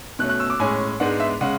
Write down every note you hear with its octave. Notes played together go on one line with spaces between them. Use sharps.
B2 A3 C#4 F#6
F#6
E6
D6
A2 G#3 C#4 G#5
G#2 G#3 B3 D4 F#5
E5
C#3 G#3 C#4 F#5